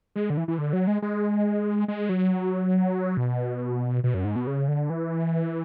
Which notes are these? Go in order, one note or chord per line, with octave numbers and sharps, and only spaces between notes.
G#3
D3
E3
E3
D3
F#3
G#3
G#3
G#3
F#3
B2
B2
F#2
G#2
B2
C#3
D3
E3